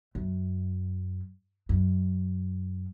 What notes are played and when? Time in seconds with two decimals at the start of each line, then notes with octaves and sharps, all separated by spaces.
0.15 F#2
1.69 F#2